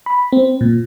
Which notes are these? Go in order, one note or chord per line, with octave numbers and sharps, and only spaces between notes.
B5
C4
A#2